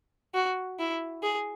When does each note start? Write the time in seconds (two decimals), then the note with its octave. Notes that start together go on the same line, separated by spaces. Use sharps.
0.34 F#4
0.79 E4
1.23 G#4